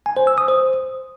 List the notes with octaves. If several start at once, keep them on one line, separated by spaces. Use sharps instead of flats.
G#5
C5
E6
D#6
C5